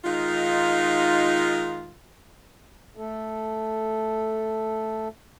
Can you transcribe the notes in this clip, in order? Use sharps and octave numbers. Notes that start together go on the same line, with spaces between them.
D#3 G#3 D#4 F4
A3 A4